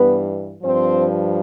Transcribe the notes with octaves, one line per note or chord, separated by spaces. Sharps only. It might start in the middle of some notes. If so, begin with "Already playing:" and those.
Already playing: G2 E3 B3 B4
G2 F3 C4 C5